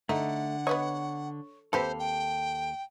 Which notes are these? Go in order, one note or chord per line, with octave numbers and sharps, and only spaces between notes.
D3 A3 D#4 F#5
B3 B4 C#5 D#5
D#2 C4 G4 A4 B4 C5 F5
G5